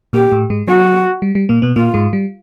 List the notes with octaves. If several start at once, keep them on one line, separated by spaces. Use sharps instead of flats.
A#2 A#3 G4
A2 A3
G#2 G#3
F#3 F#4
G3
G3
A#2 A#3
B2 B3
A#2 A#3 F4
G#2 G#3
G3